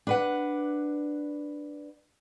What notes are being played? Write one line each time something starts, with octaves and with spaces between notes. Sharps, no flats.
D4 B4 F#5